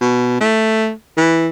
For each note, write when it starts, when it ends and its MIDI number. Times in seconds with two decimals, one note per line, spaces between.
0.01 0.38 47
0.40 0.91 57
1.17 1.48 52